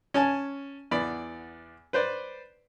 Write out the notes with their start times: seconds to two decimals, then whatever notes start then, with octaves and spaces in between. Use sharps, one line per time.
0.14 C#4 G#5 A5
0.91 E2 B3 D5 B5
1.93 B4 C5 D5